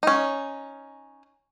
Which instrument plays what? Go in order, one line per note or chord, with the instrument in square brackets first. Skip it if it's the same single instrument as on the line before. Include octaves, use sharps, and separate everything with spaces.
[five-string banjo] C#4 D#4